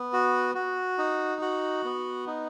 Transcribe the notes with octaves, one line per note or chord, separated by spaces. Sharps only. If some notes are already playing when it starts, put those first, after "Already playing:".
Already playing: B3
F#4
F#4
D#4
F#4
B3
D#4